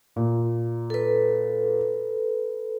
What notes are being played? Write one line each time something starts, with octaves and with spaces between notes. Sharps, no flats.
A#2
A4 B4